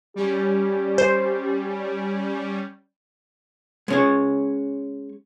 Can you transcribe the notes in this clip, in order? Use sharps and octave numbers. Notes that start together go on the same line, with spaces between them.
G3 C#4 G4
C5
G#3 C#4 C#5